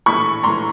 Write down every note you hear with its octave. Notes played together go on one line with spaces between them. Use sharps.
A#1 A2 E3 B5 C#6
A#1 A2 E3 A#5 C6